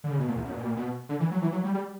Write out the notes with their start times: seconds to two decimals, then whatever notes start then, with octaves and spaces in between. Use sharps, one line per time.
0.04 D3
0.11 C#3
0.19 B2
0.28 A#2
0.36 E2
0.44 F#2
0.50 B2
0.54 A#2
0.61 B2
0.66 A#2
0.76 B2
1.09 D3
1.20 E3
1.31 F#3
1.42 E3
1.52 F#3
1.64 G3
1.74 G3